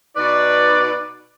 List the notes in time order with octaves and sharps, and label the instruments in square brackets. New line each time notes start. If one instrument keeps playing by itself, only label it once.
[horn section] B2 D#4 B4 D5